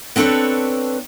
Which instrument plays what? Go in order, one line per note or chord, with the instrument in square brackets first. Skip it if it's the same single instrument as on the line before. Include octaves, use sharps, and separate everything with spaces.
[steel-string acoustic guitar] B3 C4 D4 A4 B4 C#5